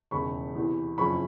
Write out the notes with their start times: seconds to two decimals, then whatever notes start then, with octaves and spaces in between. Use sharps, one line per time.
0.11 E1 D#2 C#3 B5 C#6
0.55 E2 C3 E3
0.98 F#1 F2 C#3 B5 C#6